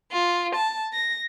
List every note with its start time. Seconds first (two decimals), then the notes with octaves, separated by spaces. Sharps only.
0.12 F4
0.55 A5
0.93 A#6